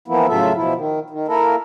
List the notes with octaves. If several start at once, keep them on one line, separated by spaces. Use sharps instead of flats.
E3 F3 A#3 B3 E4
A2 C#3 F#3 F4 A4 E5
B2 F3 E4
D#3
D#3
A#3 E4 A4 A#4